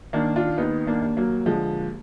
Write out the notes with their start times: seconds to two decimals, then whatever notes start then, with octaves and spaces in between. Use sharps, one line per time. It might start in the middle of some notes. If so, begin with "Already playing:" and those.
0.13 D#3 A#3 D4
0.36 D4 F4
0.58 D#2 B3 D#4
0.87 A#3 D4
1.02 D#2
1.17 F#3 A#3
1.46 D3 F3 G#3